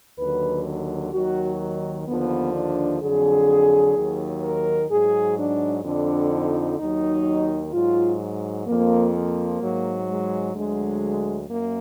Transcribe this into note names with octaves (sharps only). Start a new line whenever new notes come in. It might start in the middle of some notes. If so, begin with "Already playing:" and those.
D#2 D3 F#3 B4
D#2 D#3 F#3 F#4
D#2 D3 F3 B3
D4
F2 D3 F#3 G#4
D#2 D#3 F#3
A#4
G#2 F#3 G#4
D4
F2 D3 F3 D4
D#4
D#2 D#3 F#3 D#4
G#2 F#3 F4
F2 F3 A#3
A#3
G#2 F#3
G#3
D2 D3 F#3 G#3
F#2 A#3